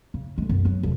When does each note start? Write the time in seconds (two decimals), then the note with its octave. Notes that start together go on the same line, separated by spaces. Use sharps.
0.14 C#3
0.38 D3 G#3
0.49 F#2 B3
0.65 F#3 B3
0.83 F1 F2